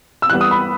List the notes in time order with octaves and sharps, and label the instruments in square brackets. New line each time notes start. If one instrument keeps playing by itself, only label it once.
[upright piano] E6
E3 G3 B3 F#6
D#6
B5